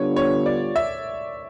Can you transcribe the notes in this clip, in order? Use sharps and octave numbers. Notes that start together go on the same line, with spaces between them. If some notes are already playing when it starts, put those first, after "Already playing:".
Already playing: D3 G3 B3 D4 F4 C#5
C#5
D5
E5